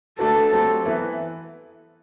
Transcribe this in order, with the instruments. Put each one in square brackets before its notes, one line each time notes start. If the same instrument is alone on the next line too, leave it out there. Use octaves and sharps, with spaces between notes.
[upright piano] D3 A3 D4 F#4 B4 [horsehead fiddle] A4
[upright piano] F#3 A3 C4 G4
E3 B3 E4 B4